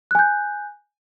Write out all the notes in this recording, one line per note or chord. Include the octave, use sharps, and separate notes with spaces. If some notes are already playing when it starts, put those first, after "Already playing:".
G#5 F#6 G6